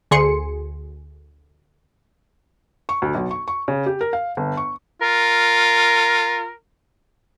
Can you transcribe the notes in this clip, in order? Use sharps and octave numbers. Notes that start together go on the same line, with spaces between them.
D2 G#4 C6 C#7
C#6
D2
B1
C#6
C#6
C#3
G4
A#4
F5
G1
C#6
F4 A#4